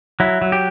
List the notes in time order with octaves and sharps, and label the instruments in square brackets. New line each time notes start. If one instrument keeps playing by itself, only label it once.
[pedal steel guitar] F#3 E4
F#3
G4